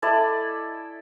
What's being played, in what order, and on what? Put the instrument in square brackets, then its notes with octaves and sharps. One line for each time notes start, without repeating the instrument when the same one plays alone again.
[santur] E4 A4 D5 D#5